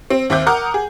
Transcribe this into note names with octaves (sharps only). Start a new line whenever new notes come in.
C4
D#2 C4 E5 D6 G6
A#4 F#5 D6 D#6 F6 G6
G#4